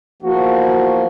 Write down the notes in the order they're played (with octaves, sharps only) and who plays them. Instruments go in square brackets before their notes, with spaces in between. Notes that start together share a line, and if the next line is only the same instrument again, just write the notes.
[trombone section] E2 F#4 [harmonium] F3 A#3